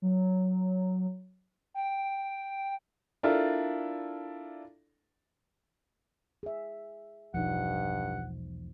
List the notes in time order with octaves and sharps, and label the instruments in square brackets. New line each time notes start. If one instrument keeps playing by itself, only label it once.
[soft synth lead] F#3
G5
[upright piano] D4 E4 F4 A4 A#4 D5
[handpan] G#4 E5
[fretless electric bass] E1 B1 [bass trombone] G2 [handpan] F3 D#4 [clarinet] F#5